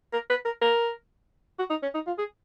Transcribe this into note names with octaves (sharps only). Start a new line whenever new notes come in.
A#4
B4
A#4
A#4
F#4
D#4
C#4
D#4
F4
G#4